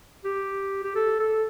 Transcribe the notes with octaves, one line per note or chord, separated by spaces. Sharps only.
G4
G4
A4
A4